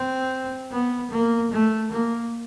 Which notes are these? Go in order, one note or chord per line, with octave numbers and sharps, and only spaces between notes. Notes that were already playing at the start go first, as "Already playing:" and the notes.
Already playing: C4
B3
A#3
A3
A#3